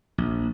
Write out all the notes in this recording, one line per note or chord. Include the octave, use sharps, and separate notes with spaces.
A#1